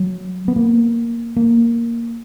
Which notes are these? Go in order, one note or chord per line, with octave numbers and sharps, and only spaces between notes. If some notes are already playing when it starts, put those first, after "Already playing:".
Already playing: F#3
B3
A#3
A#3